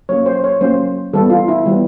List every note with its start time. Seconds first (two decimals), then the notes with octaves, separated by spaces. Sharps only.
0.09 F#3 A#3 C#4 C#5
0.26 C5
0.44 C#5
0.61 F#3 A#3 C#4 C5
1.13 E3 G3 B3 A4
1.30 F4
1.48 E4
1.66 E3 G3 B3